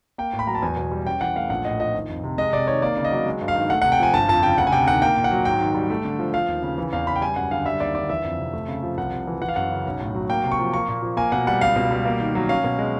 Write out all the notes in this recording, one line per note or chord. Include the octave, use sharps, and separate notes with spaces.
A#3 G5
A2
B5
F#3 A#5
A5
E2 G#5
B2
G3
C#4 G5
E3 F#5
A3 F5
A#1 F#5
A2 D#5
F3 D#5
D#3
F2
C3
G#3 D#5
C3 D5
D#3 C#5
A#3 D5
C#3
D#5
F#3
G#3
G2
F5
D#3
A3 F#5
C3 F#5
G5
F3 G#5
G1 A5
F2 A5
C#3 G5
D2 F#5
G#5
C3 G5
D#3 F#5
A#3 G5
A#2
F#5
F#3
G#2 G5
D#3
G3
A3
D3
F3
F3 F5
D#2
C#3
E3
E2 F5
C#3 B5
G5
G3 G#5
F#2 F#5
D3 F5
G3 E5
D#2 D5
D3 D5
E3 E5
F2
C3
A3
C#3
F3
C2 F#5
C3
E3
E3 F#5
F5
F#2 F#5
C#3
B1
A2
F#3
A#3 G5
C3
C#6
F3
A#3 C#6
A#2
F3
A#3 G#5
B2 F#5
G3 F#5
C#2 F5
B2
G3
A#3
D#3
F#3
C#4 F5
B2
G#3